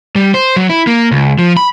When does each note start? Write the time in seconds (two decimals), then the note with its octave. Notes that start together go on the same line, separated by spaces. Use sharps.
0.16 G3
0.34 C5
0.56 F#3
0.69 E4
0.87 A#3
1.12 C#2
1.39 F3
1.57 B5